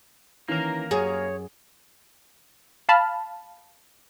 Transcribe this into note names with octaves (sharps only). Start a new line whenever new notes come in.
D#3 E3 A#3 C#4 A#4
F#2 F#4 G#4 C#5
F5 A5 B5 F6